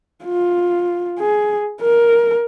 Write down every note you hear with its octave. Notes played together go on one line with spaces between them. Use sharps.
F4
G#4
A#4